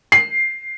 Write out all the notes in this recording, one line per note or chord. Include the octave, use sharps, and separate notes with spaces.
C7